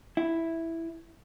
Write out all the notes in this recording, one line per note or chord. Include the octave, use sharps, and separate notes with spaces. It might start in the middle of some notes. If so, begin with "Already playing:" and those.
E4